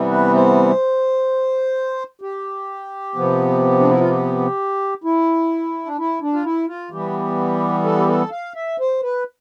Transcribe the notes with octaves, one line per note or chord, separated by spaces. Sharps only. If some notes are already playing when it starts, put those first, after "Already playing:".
Already playing: C3 E3 G3 B3
B4
C5
G4
C3 F3 B3
D4
E4
F4
G4
E4
D4
E4
D4
F4
E4
F4
E3 G3 B3 G4
A4
G4
A4
F5
E5
C5
B4